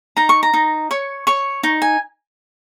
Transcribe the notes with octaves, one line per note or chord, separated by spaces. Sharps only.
D#4 A#5
C#6
A#5
D#4
C#5 C#6
C#5 C#6
D#4
G#5